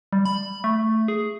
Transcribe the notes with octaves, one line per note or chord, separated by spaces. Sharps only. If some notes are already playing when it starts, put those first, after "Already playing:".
G3
B5
A3
G#4